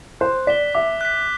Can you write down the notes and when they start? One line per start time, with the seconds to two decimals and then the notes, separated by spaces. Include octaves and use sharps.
0.21 C5 F#6
0.47 D5 B6 E7 G7
0.75 E5 D6
1.01 F#6 B6